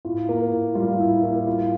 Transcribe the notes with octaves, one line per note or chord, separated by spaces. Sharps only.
A2 F4
A#3
A2
G3 F4
A2 E4
A#3 E4
A2 F4